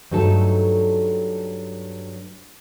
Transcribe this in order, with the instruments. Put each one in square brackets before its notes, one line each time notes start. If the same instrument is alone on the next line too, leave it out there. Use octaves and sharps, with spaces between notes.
[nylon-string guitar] G2 F#3 A3 D#4 A4